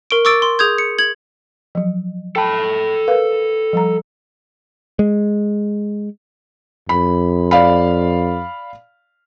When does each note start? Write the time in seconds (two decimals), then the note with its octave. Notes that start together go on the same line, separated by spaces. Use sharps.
0.11 A#4 C#6 D7
0.25 C#6 D6 E6 A6 D7
0.42 C6
0.59 G#4 D#6 G6 G#6
0.78 C#7
0.99 G#6 F#7
1.75 F3 F#3
2.36 A4 G5 A5 B5
3.08 A#4 B4 F5
3.73 F3 G3 A#5
4.99 G#3
6.89 F2 B5
7.51 D5 F5 B5